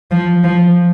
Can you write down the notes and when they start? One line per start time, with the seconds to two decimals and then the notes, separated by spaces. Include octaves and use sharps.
0.11 F3
0.44 F3